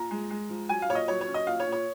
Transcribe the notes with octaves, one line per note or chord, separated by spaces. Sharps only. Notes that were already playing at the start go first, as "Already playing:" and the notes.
Already playing: A#2 A#5
G#3
G#3
F3
F#3 G#5
F5
A#2 C#5
D#5
F#3 C#5
C#5
C#4
D#5
A#2 F5
C#5
A#2
C#5